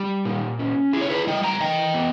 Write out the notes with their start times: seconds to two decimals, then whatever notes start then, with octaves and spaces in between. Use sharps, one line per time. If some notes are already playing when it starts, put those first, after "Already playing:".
Already playing: G3 G4
0.25 A#2
0.59 C#4
0.93 E4 G#4
1.01 C#5
1.10 G#4 B4
1.27 G3 D#5 G5
1.43 G5 A#5
1.60 E3 D#5 G5
1.94 B3